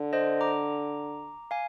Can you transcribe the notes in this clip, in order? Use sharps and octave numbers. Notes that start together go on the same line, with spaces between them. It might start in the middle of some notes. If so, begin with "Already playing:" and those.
Already playing: D3
C5 D#5
A#5 D6
F5 G#5